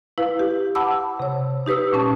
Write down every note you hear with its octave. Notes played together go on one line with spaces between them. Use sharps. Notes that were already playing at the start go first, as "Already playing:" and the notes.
E4 B4 F5
G4
F#5 A5 B5 D6 E6
C3 C#5
D#4 G4 B4 D#6 E6
A#2 C#4 A5